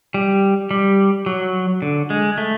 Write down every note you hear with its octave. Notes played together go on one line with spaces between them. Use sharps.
G3
G3
F#3
D3
G#3
A3